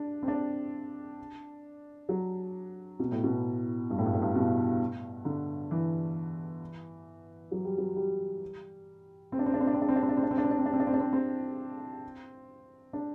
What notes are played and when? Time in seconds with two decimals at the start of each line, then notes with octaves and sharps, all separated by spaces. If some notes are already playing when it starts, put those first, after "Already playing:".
Already playing: D4
0.23 C4
0.28 D4
2.09 F#3
2.99 B2
3.12 A2
3.24 B2
3.90 G2
3.98 A2
4.06 G2
4.13 A2
4.22 G2
4.35 B2
5.25 D3
5.71 E3
7.51 F#3
7.65 G3
7.78 F#3
7.96 G3
9.32 C4
9.39 D4
9.46 C4
9.54 D4
9.61 C4
9.67 D4
9.74 C4
9.82 D4
9.89 C4
9.96 D4
10.03 C4
10.09 D4
10.17 C4
10.23 D4
10.31 C4
10.38 D4
10.44 C4
10.51 D4
10.58 C4
10.66 D4
10.73 C4
10.80 D4
10.87 C4
10.94 D4
11.00 C4
11.13 C4
12.93 D4